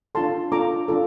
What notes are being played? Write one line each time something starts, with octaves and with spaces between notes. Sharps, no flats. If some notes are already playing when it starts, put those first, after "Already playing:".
D4 F4 A4 A5 C6
D4 F4 A4 A#5 D6
D4 F4 A4